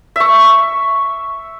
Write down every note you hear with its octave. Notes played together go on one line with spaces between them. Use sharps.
E5 C#6